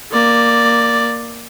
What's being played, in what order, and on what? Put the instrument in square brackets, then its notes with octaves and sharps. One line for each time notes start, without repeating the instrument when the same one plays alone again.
[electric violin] A#3 D5